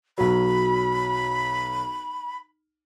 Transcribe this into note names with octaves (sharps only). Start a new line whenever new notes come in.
B1 F#3 B5